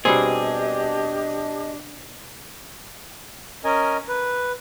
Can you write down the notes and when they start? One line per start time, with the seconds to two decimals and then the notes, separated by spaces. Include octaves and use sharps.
0.05 B2 G3 C4 D4 G4 G#4 D#5
3.64 C#4 A#4 D#5 G#5
4.09 B4